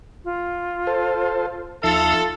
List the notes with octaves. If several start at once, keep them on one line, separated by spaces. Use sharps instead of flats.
F4
A4 C5
D#2 F3 D#4 F4 A4 E5